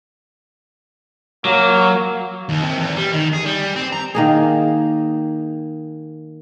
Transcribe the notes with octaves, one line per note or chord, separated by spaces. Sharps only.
F#3 A#3
D#2
C3
E2
G3
D#3
G#4
G3
C4
A#5
D#3 A#3 G#4